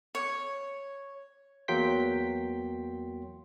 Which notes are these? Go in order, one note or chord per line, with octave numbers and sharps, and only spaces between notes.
C#5
E2 F#3 A#3 G5 C6 B6